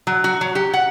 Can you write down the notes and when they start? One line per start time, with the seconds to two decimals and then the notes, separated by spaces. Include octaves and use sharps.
0.07 F#3
0.24 F#4
0.41 F#3
0.55 G4
0.74 F#5